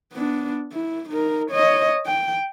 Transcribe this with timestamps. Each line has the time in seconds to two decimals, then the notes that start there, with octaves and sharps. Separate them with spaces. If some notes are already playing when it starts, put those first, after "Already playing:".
0.14 B3 D4
0.73 E4
1.09 D#4 A#4
1.51 C#5 D#5
2.06 G5